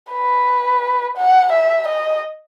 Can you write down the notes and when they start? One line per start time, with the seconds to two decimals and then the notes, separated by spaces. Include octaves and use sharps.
0.12 B4
1.17 F#5
1.52 E5
1.87 D#5